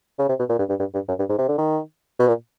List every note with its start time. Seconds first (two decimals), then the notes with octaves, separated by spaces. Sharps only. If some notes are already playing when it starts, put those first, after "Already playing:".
0.19 C#3
0.29 C3
0.39 B2
0.49 A#2
0.59 G2
0.69 G2
0.79 G2
0.94 G2
1.08 F#2
1.19 G2
1.29 G#2
1.38 C3
1.48 D3
1.58 D#3
2.19 B2
2.28 A#2